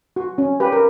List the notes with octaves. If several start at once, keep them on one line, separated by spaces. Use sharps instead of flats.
F#4
C#4
G4 B4
A#4